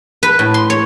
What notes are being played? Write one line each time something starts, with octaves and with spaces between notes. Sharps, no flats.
B4
A2
C6
C#5